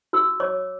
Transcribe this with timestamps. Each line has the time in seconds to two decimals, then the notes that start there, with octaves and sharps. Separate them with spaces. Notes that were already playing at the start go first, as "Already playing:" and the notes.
0.13 F#4 E6
0.40 C#5 D6